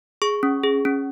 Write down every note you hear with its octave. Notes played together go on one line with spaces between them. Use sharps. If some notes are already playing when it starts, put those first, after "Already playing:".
G#4 C#6
C#4
G#4
C#4